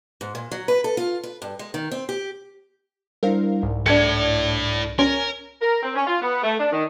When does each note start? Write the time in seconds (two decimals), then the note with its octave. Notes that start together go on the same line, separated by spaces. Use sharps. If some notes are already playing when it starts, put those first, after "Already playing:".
0.21 G#2
0.35 A#2
0.51 F#3
0.68 B4
0.84 A4
0.97 F4
1.23 B4
1.42 G2
1.59 G#3
1.74 D#3
1.91 C4
2.09 G4
3.23 G3 D4 E4 A#4 C5 F5
3.63 C2 G#2
3.86 D4 E4 A4 G#6 C#7
4.99 C#4 A#4 C#5
5.61 A#4
5.83 C4
5.95 C#4
6.07 F4
6.22 B3
6.43 A3
6.59 D4
6.72 D#3